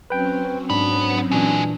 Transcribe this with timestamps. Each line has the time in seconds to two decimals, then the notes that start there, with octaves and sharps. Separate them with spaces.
0.10 F#3 C4 C#4 B4 G5
0.70 G#2 B3 D4 B5
1.31 A#2 E3 G#3 D4 F#4